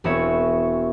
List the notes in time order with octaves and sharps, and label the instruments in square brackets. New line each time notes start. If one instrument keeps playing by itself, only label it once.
[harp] E1 B3 C4 G#4 C#5 E5